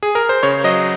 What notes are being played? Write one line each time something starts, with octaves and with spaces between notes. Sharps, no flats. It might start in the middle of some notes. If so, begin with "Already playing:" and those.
G#4
A#4
C5
C#3 C#5
F#3 D#5